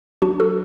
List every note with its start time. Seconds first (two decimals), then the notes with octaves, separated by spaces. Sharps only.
0.22 F#3 D4 F#4
0.40 F#4 A4